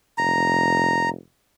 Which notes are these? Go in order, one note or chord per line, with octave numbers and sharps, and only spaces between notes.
F1 A#5